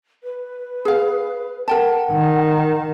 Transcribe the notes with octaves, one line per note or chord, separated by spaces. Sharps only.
B4
G#4 F5
A#4 F#5 G5 A5
D#3